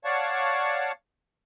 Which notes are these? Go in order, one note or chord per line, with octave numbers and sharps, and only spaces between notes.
C#5 D5 F5 F#5 A5 C#6